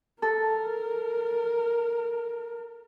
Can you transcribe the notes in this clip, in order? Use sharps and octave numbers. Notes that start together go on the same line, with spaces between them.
A4 A#4